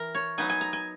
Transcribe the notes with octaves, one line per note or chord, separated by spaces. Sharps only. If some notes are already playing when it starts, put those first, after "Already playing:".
Already playing: E3 A#4
C#5
F#3 B3 D#4 G#5
G#5
A#5
G#5